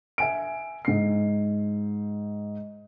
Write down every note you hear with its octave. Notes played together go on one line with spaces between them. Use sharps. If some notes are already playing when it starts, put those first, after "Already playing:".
E5 G#5 D7
G#2 C7